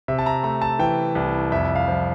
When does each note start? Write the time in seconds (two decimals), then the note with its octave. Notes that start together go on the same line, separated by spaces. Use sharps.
0.08 C3 E5
0.19 A5
0.26 A#5
0.43 A3 A#5
0.62 A5
0.79 E3 G5
1.15 C2
1.52 F2 E5
1.76 F5
1.88 F3